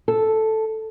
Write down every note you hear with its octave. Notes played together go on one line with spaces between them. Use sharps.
A4